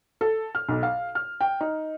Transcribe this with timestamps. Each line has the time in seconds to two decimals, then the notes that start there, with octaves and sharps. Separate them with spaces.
0.21 A4
0.55 F6
0.69 B1
0.83 F5
1.15 F6
1.41 G5
1.61 D#4